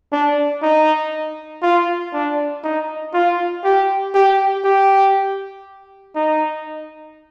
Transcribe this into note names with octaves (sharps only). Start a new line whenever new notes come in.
D4
D#4
F4
D4
D#4
F4
G4
G4
G4
D#4